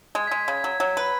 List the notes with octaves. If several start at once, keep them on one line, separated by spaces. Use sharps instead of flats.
G#3 G#6
B6
G#3
B6
C#3 G#6
B6
F#3 G#6
F#3
B4